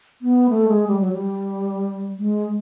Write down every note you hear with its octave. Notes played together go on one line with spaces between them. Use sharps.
B3
A3
G#3
G3
F#3
G3
G#3